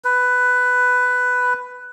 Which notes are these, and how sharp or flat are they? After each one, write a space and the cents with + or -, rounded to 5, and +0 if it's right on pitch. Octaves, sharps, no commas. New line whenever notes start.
B4 +10